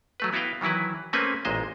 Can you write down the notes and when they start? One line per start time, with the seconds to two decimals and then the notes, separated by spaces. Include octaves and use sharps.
0.20 F#3 A3 B4
0.33 B3 E4 F#4 B4 F5 G5
0.61 D#3 E3 F#3 E4 B4
1.13 A3 A#3 C4 C#4 B4 G#5
1.45 A1 A#2 G#3 C5 D#5